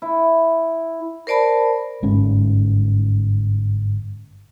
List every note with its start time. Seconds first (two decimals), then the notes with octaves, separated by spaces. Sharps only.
0.02 E4
1.27 A#4 C5 D5 A5 B5
2.03 G1 G#2 C#4